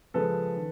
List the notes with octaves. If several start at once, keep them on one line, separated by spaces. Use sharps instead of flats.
C#3 F3 G#3 A4 B4
D#3